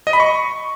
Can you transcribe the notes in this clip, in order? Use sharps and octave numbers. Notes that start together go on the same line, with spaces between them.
D#5
B5
C#6